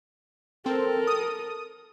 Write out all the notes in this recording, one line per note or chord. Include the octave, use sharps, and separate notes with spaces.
C4 A4 A#4
D#6